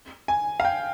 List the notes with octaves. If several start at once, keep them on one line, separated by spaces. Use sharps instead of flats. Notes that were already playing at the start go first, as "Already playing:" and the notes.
G#5
F5
G5